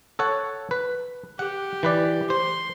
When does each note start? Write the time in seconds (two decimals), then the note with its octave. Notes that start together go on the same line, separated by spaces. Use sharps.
0.19 A4 C#5 F#5
0.71 B4
1.39 G4 F#5
1.83 E3 B4 D5
2.30 C5 C6